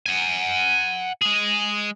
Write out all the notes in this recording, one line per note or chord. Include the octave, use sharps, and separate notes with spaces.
F#5 G#5
G#3 G#4